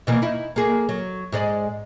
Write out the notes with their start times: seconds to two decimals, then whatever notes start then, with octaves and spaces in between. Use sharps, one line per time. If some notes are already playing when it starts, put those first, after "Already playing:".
0.07 B2 E3 A#3
0.22 D#4 E4
0.56 A#3 G#4
0.89 F#3
1.32 G#2 G#3 D5